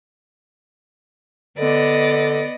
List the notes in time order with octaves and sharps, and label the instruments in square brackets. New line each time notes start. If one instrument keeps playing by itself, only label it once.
[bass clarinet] D3 [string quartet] B3 D5 D#5